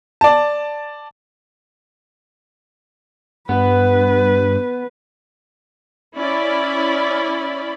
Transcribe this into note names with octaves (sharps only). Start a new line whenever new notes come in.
D5 A5
G2 B3 B4
C#4 E4 D5 B5